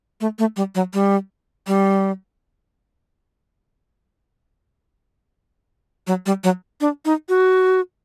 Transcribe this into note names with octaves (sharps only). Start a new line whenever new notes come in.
A3
A3
G3
F#3
G3
G3
F#3
G3
F#3
D4
D#4
F#4